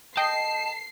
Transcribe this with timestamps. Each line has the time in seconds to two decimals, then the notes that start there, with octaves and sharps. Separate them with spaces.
0.17 D#5 G5 A5 C7